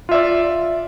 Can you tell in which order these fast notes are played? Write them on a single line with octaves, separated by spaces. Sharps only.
F4 E5 D5